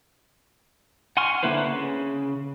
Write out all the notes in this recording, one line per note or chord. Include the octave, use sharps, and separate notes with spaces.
F#5 G#5 C6 C#6 F6
D3 A#3 E4 B4 C5
C#3